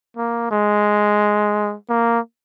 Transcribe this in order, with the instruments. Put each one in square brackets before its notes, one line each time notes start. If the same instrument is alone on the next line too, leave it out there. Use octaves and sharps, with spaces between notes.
[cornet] A#3
G#3
A#3